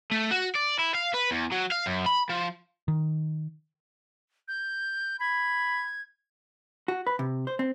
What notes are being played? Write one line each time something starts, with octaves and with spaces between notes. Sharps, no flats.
A3
F#4
D5
E4
F5
B4
E2
F#3
F5
F#2
B5
F3
D#3
G6
B5 G#6
F#4
B4
C3
C5
C4